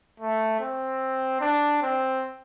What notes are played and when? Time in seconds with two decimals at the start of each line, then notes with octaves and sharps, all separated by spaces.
0.20 A3
0.60 C4
1.41 D4
1.82 C4